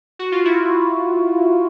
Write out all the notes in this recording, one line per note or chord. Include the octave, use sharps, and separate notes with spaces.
F#4
F4
E4 F#4